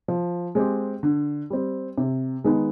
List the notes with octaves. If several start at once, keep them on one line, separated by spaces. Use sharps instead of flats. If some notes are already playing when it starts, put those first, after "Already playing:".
F3
G#3 C4 G4
D3
G3 C4
C3
D#3 G#3 B3 D#4